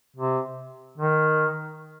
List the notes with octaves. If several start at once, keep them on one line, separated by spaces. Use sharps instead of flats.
C3
D#3